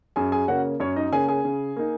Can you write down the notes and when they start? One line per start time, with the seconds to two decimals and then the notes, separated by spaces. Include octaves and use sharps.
0.16 F#2 G#4 G#5
0.32 G#4 G#5
0.48 C#3 A#3 C#4 F#4 F#5
0.80 F#2 C#4 C#5
0.96 D#4 D#5
1.12 C#3 A#3 C#4 G#4 G#5
1.28 G#4 G#5
1.45 C#3
1.76 A#3 D#4